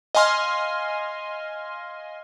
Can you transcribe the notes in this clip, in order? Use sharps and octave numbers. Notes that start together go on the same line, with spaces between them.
D#5 F5 G#5 C6 F6